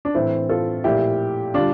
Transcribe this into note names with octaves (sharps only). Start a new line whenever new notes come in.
D4
A2 E3 A3 C4 E4
F4 A4
A#2 F3 A3 E4 G4
D3 G3 D4 F4